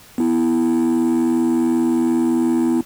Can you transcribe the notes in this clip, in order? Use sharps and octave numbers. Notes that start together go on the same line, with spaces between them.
B3 E4